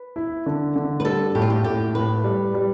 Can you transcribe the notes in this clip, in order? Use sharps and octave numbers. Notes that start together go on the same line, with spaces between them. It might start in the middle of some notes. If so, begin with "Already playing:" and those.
Already playing: B4
E4
D3
D3
B4
G3 A4
A2 G4
F4
G4
A2 G4
A2 B4
G3
G3